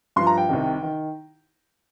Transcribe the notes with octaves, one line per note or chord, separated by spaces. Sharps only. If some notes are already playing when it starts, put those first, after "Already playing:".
G2 F3 C6
A#5
G5
C2 C3 D#3
D#3